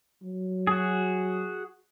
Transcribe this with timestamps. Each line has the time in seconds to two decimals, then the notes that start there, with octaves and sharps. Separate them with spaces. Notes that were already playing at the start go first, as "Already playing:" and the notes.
0.23 F#3
0.67 F#4 G#4